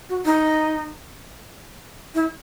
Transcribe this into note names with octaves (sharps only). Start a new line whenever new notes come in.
F#4
D#4
E4